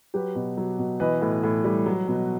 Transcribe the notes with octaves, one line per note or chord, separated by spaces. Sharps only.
F#3 G4 B4
B2
F#3
B2
E3 B4 D#5
A2
A2
G3
F#3
B2